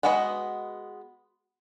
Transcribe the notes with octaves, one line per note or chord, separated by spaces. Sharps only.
G#3 B3 F#4 B4 D#5